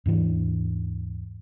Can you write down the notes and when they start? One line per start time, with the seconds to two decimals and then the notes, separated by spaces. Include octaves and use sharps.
0.06 D#2 G#2 E3 D4